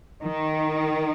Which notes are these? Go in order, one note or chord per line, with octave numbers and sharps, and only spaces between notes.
D#3